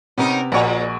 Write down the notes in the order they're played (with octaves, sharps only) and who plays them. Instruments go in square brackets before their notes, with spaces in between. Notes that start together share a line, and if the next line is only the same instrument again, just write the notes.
[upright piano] C3 [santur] B3 [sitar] C#4 D#4 A#4
[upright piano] A#1 G#5 [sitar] A#2 C#5 [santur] G#3 F#4 A#4